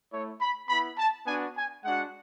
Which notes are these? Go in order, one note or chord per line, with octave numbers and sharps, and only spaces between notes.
A3 E4 C#5
B5
B3 E4 B5
A5
B3 D4 F#4 G#5
G#5
G#3 D4 F#4 F#5